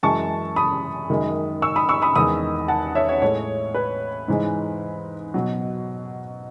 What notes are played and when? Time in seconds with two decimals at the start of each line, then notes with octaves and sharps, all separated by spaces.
0.03 F#2 E3 G#3 A5 C#6
0.56 B5 D#6
1.10 F#2 D#3 G#3
1.62 C#6 E6
1.76 B5 D#6
1.89 C#6 E6
2.02 B5 D#6
2.15 E2 D#3 G#3 B5 D#6
2.68 F#5 A5
2.95 C#5 E5
3.09 C#5
3.22 A2 G#3 C#5
3.75 B4
4.28 G#2 E3 G#3
5.34 B2 F#3